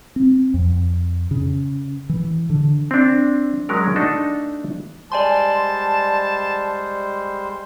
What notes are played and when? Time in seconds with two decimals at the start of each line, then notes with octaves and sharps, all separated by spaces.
0.16 C4
0.54 F2
1.31 C#3
2.09 E3
2.50 D3
2.91 C4 D4
3.69 F#3 G#3 C#4 D4 A#4
3.96 A3 D4 D#4 F#4 A4
5.12 G3 G#3 C5 D5 G#5 A5 C6